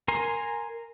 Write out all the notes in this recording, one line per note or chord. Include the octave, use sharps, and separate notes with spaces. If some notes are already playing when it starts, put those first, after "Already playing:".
A#4 G#5 A#5 C6